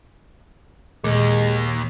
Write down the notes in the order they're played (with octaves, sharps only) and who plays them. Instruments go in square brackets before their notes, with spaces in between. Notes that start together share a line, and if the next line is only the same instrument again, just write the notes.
[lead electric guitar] D#2 [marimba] A#2 [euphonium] G#3